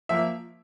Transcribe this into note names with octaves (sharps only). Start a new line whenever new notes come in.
F3 A#3 E5